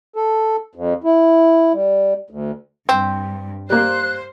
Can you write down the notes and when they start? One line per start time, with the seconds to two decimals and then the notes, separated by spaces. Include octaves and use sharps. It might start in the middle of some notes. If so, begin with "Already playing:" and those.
0.16 A4
0.75 F2
1.04 E4
1.73 G3
2.30 D2
2.89 G2 C4
3.70 G3 A#3 C5 F#6